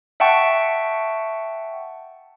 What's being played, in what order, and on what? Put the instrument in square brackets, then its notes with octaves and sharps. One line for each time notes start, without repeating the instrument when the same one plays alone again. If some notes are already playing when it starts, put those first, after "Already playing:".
[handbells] E5 F#5 G5 A5 C#6